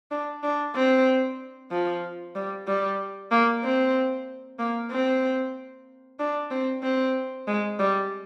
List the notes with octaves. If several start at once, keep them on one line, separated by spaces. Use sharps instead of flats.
D4
D4
C4
F3
G3
G3
A#3
C4
A#3
C4
D4
C4
C4
G#3
G3